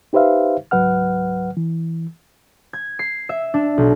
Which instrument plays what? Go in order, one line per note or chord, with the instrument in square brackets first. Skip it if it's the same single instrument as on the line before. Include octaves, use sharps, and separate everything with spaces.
[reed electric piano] D#4 G4 B4 C5 E5 F5
C#2 G#2 F#3 B4 F#5 F6
E3
[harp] G#6
C7
E5
D4
B1